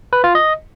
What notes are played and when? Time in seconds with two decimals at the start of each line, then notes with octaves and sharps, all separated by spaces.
0.13 B4
0.24 F4
0.35 D#5